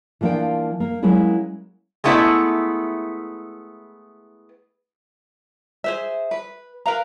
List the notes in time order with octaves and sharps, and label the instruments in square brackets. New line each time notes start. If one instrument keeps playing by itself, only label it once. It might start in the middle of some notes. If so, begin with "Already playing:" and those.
[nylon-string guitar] E3 F3 A#3 D4 F4 G5
A#3
F#3 G#3 A#3 C#4 E4 G#4
[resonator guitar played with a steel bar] G#3 A3 B3 E4 B4 E5
[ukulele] G#4 C5 E5
B4
A#4 B4 F5 A#5